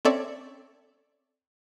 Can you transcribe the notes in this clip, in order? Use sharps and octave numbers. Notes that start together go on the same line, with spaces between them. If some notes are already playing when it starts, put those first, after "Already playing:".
C4 C#4 A4 C#5 D5 E5